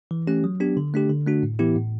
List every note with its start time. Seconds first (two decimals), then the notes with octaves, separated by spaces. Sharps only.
0.11 E3
0.27 A3 C#4 G4
0.44 F#3
0.60 B3 D4 G4
0.77 D3
0.94 A3 D4 G4
1.10 D3
1.27 A3 D4 F#4
1.43 A2
1.59 E3 B3 E4 G4
1.76 A2